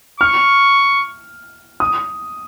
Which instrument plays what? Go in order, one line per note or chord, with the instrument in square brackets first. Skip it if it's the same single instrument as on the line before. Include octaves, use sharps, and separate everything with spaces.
[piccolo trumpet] C#6 [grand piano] F6
[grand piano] D#6